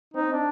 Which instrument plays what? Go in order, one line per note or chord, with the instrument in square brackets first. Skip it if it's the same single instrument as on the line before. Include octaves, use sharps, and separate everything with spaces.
[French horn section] C4 [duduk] D#4
[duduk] D4